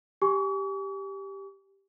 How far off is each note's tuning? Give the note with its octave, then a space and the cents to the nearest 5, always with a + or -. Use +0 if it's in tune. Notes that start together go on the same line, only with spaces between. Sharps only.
G4 +0 G#5 +0 C#6 +45